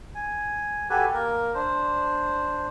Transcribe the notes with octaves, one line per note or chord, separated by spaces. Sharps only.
G#5
F#4 G4 A4 B4 G#5
A#3 A#4
D4 C5